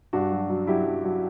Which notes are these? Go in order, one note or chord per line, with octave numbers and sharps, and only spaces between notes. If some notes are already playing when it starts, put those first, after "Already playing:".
G2 D4 F#4
F#3
F#3
F#3 E4 G4
F#3
F#3